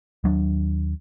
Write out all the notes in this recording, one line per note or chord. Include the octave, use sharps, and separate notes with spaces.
D#2 F#3 D4